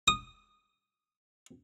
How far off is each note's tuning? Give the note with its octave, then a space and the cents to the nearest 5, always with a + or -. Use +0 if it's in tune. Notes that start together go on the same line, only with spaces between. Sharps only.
D#6 -10